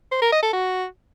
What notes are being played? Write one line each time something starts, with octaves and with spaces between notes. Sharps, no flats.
C5
A#4
D#5
A4
F#4